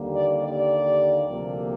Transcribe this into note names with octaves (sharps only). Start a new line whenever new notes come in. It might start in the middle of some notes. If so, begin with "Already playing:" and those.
Already playing: D#2 D3 G3 A#3
D5
D5
D2 C3 F3 A#3